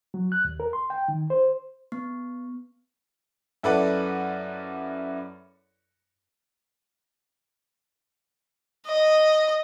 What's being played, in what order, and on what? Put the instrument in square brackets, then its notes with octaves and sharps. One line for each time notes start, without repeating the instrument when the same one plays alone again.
[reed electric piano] F#3
F#6
D#2
A#4
C6
G5
D#3
C5
[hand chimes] B3
[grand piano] F#2 E4 A4 B4 D5 F#5
[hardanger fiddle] D#5